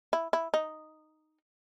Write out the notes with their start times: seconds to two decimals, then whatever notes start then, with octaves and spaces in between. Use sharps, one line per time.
0.13 E4
0.33 E4
0.54 D#4